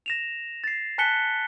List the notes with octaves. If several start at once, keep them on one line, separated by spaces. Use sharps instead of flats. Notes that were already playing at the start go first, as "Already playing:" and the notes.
A#6 E7 F7
A6 C7
G#5 A5 F#6 B6 C#7 G7